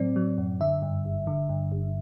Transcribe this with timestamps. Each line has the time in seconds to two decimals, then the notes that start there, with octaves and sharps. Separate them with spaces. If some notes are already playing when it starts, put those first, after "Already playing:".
Already playing: A2 F#3 C4 D5
0.16 F#3
0.38 F#2
0.61 D3 E5
0.82 G2
1.05 G1
1.27 D3
1.49 G2
1.72 G1